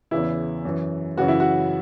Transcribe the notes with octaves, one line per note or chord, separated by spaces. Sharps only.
E2 C#3 E3 E4
F#2 E3
F#2 C#3 E3 F#4
E4
F#4